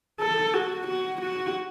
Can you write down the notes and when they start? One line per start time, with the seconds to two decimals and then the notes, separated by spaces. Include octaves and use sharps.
0.20 A4
0.54 F#4
0.88 F#4
1.21 F#4